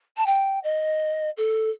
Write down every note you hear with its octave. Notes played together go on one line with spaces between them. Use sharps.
A5
G5
D#5
A4